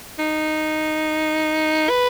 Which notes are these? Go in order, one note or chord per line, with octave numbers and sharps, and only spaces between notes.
D#4
B4